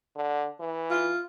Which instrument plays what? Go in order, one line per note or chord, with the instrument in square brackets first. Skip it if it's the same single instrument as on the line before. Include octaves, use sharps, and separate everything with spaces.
[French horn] D3
E3
[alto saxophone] F4